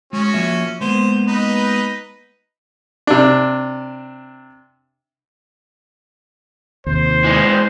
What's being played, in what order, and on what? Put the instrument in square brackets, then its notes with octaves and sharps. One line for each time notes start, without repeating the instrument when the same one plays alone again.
[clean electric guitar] G#3 [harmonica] C#4 F#4
[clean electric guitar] F3 A#3 E5
[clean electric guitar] G#3 A#3 B3 [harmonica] C5
[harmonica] D#4 B4 D#5
[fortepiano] C3 D4
[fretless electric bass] D#2 C3 [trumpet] C5
[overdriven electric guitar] E3 G#3